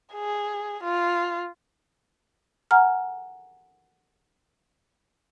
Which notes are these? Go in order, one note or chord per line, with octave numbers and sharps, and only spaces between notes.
G#4
F4
F#5 G#5 A#5 F6